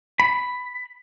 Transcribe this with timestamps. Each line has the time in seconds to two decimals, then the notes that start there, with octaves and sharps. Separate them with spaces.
0.20 B5